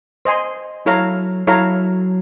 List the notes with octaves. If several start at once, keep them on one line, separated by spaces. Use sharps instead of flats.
C5 D#5 G#5 C6
F#3 E4 A4 C#5 F5 A#5
F#3 E4 A4 C#5 F5 A#5